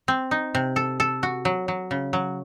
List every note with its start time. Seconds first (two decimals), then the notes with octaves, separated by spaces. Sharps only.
0.08 C4
0.31 D#4
0.55 C3
0.76 A4
1.00 A4
1.23 F#4
1.45 F#3
1.68 F#3
1.91 C#3
2.13 F#3